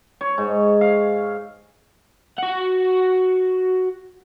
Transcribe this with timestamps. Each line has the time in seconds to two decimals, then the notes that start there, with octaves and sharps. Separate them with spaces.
0.21 C#5
0.38 G#2
0.81 F5
2.38 F#4 F#5